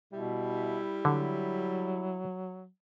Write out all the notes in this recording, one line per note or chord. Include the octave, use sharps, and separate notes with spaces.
B2 G3 E4
D3 F#3